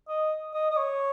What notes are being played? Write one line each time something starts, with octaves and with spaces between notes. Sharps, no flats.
D#5
D#5
D#5
C#5